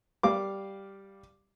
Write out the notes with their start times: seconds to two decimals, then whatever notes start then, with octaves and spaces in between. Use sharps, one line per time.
0.23 G3 F5 D6